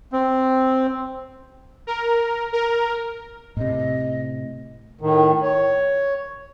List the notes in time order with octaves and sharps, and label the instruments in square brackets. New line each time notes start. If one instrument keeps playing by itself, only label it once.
[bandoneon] C4
[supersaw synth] A#4
A#4
[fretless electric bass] A2 C3 [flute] D#5
[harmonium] A2 D#3
C#5